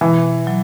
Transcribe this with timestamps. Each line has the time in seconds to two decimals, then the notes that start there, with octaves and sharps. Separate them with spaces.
0.01 B2 E3
0.47 F#3